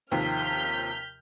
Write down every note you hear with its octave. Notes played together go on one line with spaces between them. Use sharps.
D#2 C3 F3 F6 G6 B6